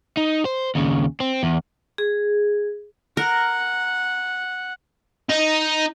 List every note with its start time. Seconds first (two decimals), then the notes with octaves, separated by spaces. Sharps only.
0.17 D#4
0.45 C5
0.75 D#2 C#3
1.20 C4
1.43 E2
1.98 G#4
3.17 A#4 F#5
5.29 D#4